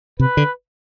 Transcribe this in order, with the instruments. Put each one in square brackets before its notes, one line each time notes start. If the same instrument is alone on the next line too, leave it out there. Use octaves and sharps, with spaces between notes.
[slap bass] C3 [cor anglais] B4
[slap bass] D3